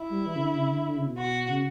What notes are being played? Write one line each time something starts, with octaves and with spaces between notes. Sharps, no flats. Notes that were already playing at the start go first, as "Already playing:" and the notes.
Already playing: E4
G3
E3
C#3
D3
C#3
D3
D3
C#3
B2
F#4
C#3